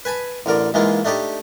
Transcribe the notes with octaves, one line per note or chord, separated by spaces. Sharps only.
B4 G#5 A5 B5
A1 D3 A#4 D5
G#2 E3 G#3 A#3 F4
A3 D4 D#4 G4 A4